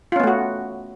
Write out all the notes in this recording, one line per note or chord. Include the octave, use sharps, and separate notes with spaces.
A3 B3 C#4 F4 F#4